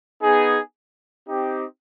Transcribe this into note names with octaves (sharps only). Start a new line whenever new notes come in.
B3 D#4 G#4
C4 D#4 G4